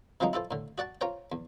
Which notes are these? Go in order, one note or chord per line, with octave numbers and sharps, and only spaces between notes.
C3 F3 F#3 G#3 A#3 D#4
E4 F4 A4 C5
A2 D3
F#4 D5 F#5 A5
F4 A#4 C5 C#5 G5
E2